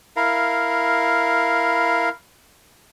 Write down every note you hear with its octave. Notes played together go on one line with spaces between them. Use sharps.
E4 A#4 F5